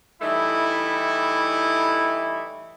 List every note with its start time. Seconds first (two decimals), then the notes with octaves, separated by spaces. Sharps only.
0.21 E3 G3 A3 D#4 E4